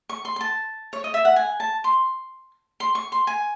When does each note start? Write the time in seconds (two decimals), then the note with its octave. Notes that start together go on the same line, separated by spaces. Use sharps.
0.09 C#6
0.25 C6
0.36 C6
0.41 A5
0.93 C#5
1.04 D#5
1.14 E5
1.25 F#5
1.36 G#5
1.60 A5
1.84 C6
2.80 C6
2.95 C#6
3.12 C6
3.27 G#5